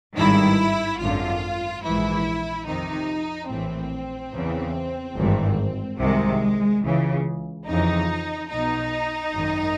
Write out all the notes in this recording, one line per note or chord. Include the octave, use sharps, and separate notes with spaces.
G#1 G2 D#3 E4
G#1 F#2 D3 F4
A#1 G#2 E3 E4
F2 C3 D#3 D#4
A#1 A2 E3 C4
E2 C#3 E3
G#1 G2 E3
C2 C3 D#3 G#3
C#2 C#3 E3
F2 C#3 E3 D#4
B1 B2 D#4
G#1 F#2 D#3